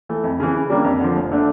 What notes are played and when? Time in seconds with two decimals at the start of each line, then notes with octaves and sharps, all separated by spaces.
0.09 E3 A3
0.24 F2
0.40 C#3 E3
0.54 C#3
0.70 G3 A#3 D4
0.84 F2
1.01 D3 F3
1.16 F1
1.32 D3 A3 D4